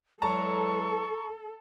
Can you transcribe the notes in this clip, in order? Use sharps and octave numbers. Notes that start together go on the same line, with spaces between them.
E2 F#3 G#3 A4 A5 A#5 C#6